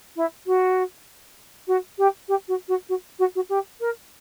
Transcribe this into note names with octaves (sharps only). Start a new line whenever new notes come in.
E4
F#4
F#4
G4
G4
F#4
F#4
F#4
F#4
F#4
G4
A#4